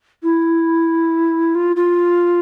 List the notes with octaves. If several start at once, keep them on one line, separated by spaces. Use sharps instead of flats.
E4
F4
F4